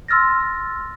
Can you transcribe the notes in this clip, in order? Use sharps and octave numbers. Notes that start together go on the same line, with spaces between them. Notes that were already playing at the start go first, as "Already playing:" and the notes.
C6 E6 F6 A6 A#6